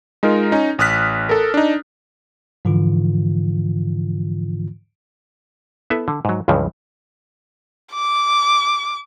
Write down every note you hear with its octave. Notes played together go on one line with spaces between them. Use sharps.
G#3 D#4 F4 A#4
C#4 D#4
A1 D#6 F6 F#6 B6
A4 A#4
D4 D#4
G#2 D3 E3 F3 F4
B3 E4 A4 B4 E5
D3
G#2 F#3
C#2 G2 C#3 E3 F3
D6